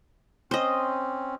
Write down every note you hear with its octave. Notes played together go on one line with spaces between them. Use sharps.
C4 C#4 C5 D#5